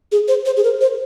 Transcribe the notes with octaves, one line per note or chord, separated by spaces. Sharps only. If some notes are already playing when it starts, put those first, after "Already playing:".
G#4
C5
C5
G#4
A#4
C5